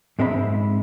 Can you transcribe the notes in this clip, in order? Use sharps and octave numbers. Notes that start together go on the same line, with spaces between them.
G#2 G#3 C4 E5 A#5 B5